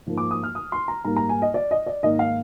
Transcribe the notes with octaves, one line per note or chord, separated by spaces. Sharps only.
G#2 F3 A#3
D6
D#6
F6
D#6
C6
A#5
G#2 G3 A#3 A#5
A#5
G#5
D#5
D5
D#5
D5
G#2 D#3 A#3 D#5
F5